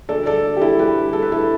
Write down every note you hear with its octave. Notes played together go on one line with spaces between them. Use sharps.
D2 D3 A4 D5
A4 D5
G4
E4 A4
G4 B4
A4
B4
E4 A4